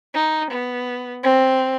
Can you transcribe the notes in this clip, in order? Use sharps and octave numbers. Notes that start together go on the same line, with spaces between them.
D#4
B3
C4